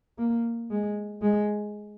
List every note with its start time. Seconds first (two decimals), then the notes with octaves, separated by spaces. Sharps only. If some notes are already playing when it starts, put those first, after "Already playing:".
0.18 A#3
0.71 G#3
1.22 G#3